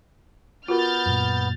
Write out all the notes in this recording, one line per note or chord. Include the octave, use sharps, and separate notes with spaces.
B3 F4 F#4 A#4 F6 G6 A6
F#2 A#2